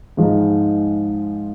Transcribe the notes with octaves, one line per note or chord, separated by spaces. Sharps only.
G#2 F3 G#3 D#4